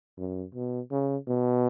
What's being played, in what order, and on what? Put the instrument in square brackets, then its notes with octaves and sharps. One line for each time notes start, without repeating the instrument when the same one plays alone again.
[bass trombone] F#2
B2
C#3
B2